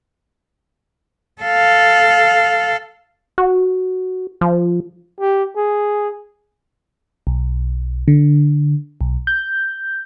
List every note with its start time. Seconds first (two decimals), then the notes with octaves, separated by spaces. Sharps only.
1.42 A4 F5
3.38 F#4
4.41 F3
5.20 G4
5.56 G#4
7.27 B1
8.08 D3
9.01 B1
9.27 G6